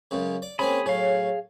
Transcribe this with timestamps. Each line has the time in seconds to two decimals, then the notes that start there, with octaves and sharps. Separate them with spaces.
0.11 C#2 F#2 C#3
0.42 D5
0.59 A#3 C4 C#4 G#4 B5
0.86 A2 F#3 G#4 F5